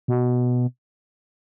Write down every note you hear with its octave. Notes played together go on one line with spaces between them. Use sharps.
B2